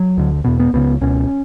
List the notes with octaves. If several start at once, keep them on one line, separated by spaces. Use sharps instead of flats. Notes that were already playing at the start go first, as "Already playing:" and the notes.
Already playing: F#3
D2 D3
E2 B2 B3
B3
C#2 C#3 B3
C#2 B2 C#4